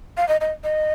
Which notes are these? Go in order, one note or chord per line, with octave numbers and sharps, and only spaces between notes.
F5
D#5
D#5
D#5